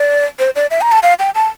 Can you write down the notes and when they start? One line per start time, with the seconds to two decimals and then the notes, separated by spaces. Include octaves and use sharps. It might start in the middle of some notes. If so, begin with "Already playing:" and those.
Already playing: D5
0.39 C5
0.56 D5
0.71 E5
0.81 A#5
0.92 A5
1.03 F5
1.19 G5
1.35 A5